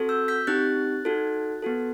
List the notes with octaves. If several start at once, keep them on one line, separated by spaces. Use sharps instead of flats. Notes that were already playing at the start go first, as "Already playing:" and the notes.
Already playing: C4 F#4 A4
E6 G6
G6 B6
C4 D#4 G4 F#6 A6
D#4 F#4 A4
B3 F#4 A4